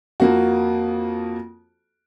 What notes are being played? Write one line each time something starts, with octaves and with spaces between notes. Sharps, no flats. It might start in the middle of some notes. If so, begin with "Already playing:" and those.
F2 A#3 F#4